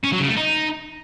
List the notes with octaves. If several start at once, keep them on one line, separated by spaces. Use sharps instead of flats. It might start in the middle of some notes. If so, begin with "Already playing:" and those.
C#4
F#3
C#3
A3
D#4